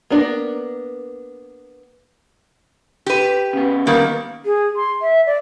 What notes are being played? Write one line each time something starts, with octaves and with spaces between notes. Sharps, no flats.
A#3 B3 D4 G#4 A#4
G4 B4
C#3 B3
D#3 G3 A#3
G#4
C6
E5
D5